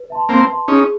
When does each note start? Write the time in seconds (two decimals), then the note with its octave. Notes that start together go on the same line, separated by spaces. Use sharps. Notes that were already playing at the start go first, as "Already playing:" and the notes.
Already playing: B4
0.10 E5 A5 C6
0.29 A#3 C4 B4
0.49 E5 A5 C6
0.68 C#4 D#4 G#4